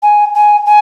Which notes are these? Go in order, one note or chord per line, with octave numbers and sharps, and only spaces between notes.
G#5
G#5
G#5